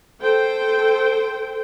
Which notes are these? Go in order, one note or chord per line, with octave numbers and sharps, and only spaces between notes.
A4 C5 G5